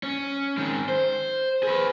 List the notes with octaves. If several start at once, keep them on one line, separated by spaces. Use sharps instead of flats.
C#4
D#3 G#3
C5
G#4 B4